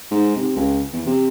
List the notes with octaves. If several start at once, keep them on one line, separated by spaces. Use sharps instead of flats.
G#2
C3
C#2
E2
C3